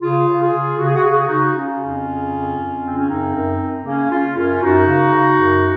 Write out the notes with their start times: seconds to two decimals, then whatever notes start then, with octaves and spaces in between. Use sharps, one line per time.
0.02 C#3 F4 G#4
0.28 C#3
0.40 F4 G#4
0.53 C#3
0.78 C#3 F#4
0.86 G#4
0.95 F#4
1.03 C#3 G#4
1.11 F#4
1.19 G#4
1.27 C#3 D#4 F#4
1.55 C#3 C#4 F4
1.81 F2
2.06 C#3
2.32 F2
2.57 F2
2.82 C#3 C4
2.97 C#4
3.08 F#2 C4 D#4
3.34 F#2
3.59 F#2
3.85 C#3 A#3 C#4
4.10 C#3 C#4 F4
4.36 F#2 C#4 F4
4.61 F#2 D#4 F#4
4.87 C#3
5.13 C#3
5.39 F#2